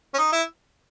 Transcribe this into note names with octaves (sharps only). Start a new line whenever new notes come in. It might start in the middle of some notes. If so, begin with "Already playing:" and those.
C#4
D#4
E4